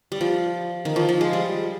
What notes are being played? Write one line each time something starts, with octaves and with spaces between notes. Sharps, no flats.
G3
F3
D#3
F3
F3
G#3
G3